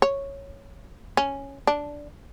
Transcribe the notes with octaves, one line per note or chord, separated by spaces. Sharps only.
C#5
C#4
D4